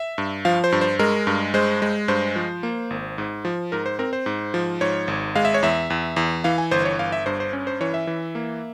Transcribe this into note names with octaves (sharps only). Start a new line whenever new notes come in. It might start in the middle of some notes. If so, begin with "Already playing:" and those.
Already playing: E5
G2
F3 F5
C5
G2
C5
G#3 A#4
G2
G#3 C5
G#3
G2 C5
F3
A#3
G#1
G#2
F3
G#2 A#4
C5
C4 A#4
C5
G#2
F3
G#2 C#5
G#1
G#3 F5
E5
C#5
E2 E5
E2
E2
E3 F5
G#5
G1 C5
C#5
G1 F5
E5
G2 C5
C5
C#4
C5
E3 C#5
E5
E3
A#3